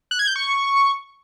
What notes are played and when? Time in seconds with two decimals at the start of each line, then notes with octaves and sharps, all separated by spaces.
0.11 F#6
0.19 G#6
0.27 G6
0.36 C#6